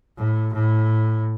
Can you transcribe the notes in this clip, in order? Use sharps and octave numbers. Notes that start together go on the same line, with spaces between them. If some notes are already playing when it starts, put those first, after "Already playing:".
A2
A2